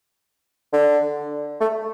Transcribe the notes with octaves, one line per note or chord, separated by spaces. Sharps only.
D3
A3